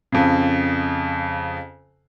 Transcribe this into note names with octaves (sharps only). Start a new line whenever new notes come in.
F2 C#3